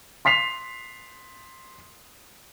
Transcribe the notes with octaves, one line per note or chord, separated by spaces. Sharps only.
C6 B6 C7 F7